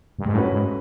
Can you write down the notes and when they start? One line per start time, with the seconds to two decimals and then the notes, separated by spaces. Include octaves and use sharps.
0.19 G2
0.25 G#2
0.34 A2 A3 C#4 F#4 B4
0.53 G#2